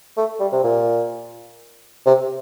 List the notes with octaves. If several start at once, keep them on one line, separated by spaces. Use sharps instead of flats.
A3
G3
C3
A#2
C3